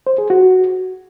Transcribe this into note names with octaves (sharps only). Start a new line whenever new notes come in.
C5
G#4
F#4